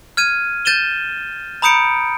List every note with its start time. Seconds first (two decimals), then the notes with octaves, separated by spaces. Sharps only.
0.17 F6 G#6 D#7
0.65 G6 A6 D#7 E7 G7
1.62 A#5 B5 D#6 G6 C#7 D7